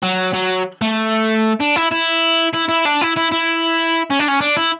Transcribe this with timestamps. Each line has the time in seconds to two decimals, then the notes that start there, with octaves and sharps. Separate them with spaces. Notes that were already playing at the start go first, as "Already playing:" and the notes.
0.03 F#3
0.34 F#3
0.82 A3
1.60 D4
1.76 E4
1.91 E4
2.54 E4
2.69 E4
2.85 D4
3.01 E4
3.16 E4
3.32 E4
4.11 C#4
4.20 D4
4.28 C#4
4.41 D4
4.57 E4